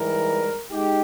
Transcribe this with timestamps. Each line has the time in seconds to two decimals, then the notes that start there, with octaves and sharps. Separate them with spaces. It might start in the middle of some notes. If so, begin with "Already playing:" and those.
Already playing: G#2 E3 G3 A#4
0.70 G#3 D#4 G4